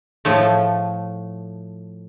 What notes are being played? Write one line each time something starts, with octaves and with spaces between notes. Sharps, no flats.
A2 F3 A3